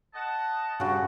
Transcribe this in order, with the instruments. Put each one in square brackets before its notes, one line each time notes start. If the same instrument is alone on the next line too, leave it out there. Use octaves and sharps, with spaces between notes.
[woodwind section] D#5 F#5 A5
[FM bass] G2 [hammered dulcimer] C#3 F#4